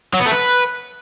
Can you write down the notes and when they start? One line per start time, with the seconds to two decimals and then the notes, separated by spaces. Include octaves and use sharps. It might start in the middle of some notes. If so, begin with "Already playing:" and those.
0.14 F#3
0.20 B3
0.26 A3
0.32 B4